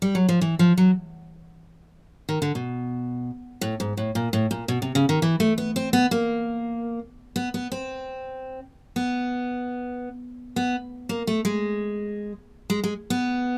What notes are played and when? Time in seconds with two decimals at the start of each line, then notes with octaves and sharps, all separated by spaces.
0.02 G3
0.15 F#3
0.29 F3
0.41 E3
0.59 F3
0.78 F#3
2.29 D#3
2.42 D3
2.55 B2
3.61 A2
3.80 G#2
3.97 A2
4.15 A#2
4.33 A2
4.51 A#2
4.68 B2
4.82 C3
4.95 C#3
5.09 D#3
5.22 E3
5.40 A3
5.58 B3
5.76 C4
5.93 B3
6.11 A#3
7.36 B3
7.54 B3
7.72 C4
8.96 B3
10.56 B3
11.09 A#3
11.27 A3
11.45 G#3
12.70 G#3
12.84 G#3
13.10 B3